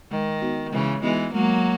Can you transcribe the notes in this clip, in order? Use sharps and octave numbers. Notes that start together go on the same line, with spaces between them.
D#3 G#3
B3 D#4 F#4
C#3 E3 G#3
E3 G#3 B3 D#4 F#4
F#3 G#3 A#3